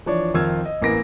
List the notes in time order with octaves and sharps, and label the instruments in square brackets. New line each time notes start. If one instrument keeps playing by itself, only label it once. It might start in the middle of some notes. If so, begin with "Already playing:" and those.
[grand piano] E3 F3 D4 C#5
F2 D#3 F4 F5 E6 G#6
D#5
A1 A#3 B3 A#6 D7